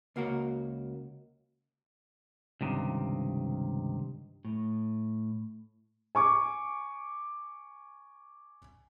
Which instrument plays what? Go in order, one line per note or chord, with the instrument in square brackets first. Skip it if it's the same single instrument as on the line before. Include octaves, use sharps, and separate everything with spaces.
[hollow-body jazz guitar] C#2 A#3 F#4 A#4
[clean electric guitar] C#2 G2 C3 D#3
[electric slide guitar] A2
[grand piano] G#5 C#6 D6